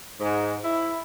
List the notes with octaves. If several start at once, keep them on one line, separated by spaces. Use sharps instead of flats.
G#2
E4